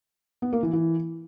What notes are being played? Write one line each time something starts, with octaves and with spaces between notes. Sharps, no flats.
B3
A#3
E3
E3